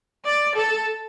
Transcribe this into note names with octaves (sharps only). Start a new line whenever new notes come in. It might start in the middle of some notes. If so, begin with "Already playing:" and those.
D5
A4